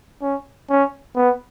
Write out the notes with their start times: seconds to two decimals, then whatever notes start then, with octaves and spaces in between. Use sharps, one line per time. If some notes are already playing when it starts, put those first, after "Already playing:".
0.21 C#4
0.69 C#4
1.16 B3